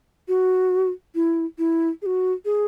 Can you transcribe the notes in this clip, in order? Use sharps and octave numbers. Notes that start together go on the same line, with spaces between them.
F#4
E4
E4
G#4
F#4
G#4